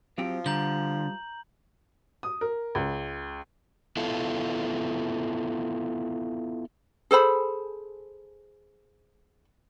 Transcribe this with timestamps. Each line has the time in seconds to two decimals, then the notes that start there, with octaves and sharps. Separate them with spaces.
0.18 F3 F#3 C4 G4
0.46 D3 G3 A#5 G6 F#7
2.23 D#6
2.41 A#4
2.75 C#2
3.97 B3 E4 F4 A4
7.11 G#4 A4 C5 B5